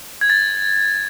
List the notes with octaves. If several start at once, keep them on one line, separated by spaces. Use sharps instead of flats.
G#6
A6